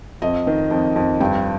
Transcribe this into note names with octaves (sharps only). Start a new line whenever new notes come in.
F2 D#5
D#3
F2
F2
G2 G5